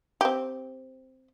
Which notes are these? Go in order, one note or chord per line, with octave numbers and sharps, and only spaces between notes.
C4 G4